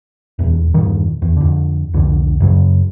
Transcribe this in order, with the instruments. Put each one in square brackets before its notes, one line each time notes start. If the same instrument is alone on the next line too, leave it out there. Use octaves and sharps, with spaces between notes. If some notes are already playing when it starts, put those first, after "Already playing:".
[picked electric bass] D#1 E2
E2 G2 A#2 D#3
E2
F2 D3
C2 F2 D3
F#2 C#3 F#3